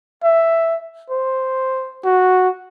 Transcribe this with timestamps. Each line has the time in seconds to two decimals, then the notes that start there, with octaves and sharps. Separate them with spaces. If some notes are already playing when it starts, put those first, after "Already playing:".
0.24 E5
1.10 C5
2.04 F#4